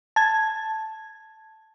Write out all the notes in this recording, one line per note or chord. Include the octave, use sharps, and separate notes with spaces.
A5 G#6